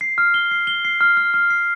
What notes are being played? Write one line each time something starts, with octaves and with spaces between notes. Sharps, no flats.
C7
F6
G7
C7
G7
C7
F6
F6
F6
C7